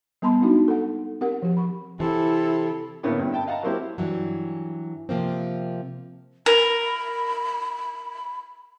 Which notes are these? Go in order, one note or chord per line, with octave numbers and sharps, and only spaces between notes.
G3 B3 A5 B5 C6
G#3 C4 D4 D#4 F#4
A4 F#5
C4 G4 A#4 F#5
F3 G4
B5 C#6
C3 E3 E4 A4
A2 D3 A#3 B3 C#4 E4
G2
E5 G5 A5 B5
D#5 F5 F#5 A5 A#5
F#3 A#3 C4 E4 G4
G2 E3 F#3
C3 F3 A#3 C4
A#4 B5